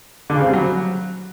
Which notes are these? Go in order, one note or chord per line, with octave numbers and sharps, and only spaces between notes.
D3
C#3
C4
G3
F#3